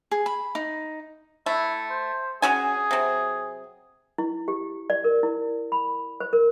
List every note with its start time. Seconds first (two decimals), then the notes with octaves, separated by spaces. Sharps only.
0.11 G#4
0.26 B5
0.55 D#4
1.46 A3 E4
1.90 C5
2.42 C#4 F#4 G#4 G#5
2.91 C3 F#3
4.18 E4
4.48 G4
4.90 D5
5.04 A#4
5.23 E4
5.72 B5
6.20 C5
6.33 A#4